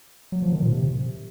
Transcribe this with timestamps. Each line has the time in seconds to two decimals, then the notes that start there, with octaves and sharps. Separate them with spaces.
0.32 F#3
0.42 F3
0.52 D#3
0.62 A#2
0.72 C3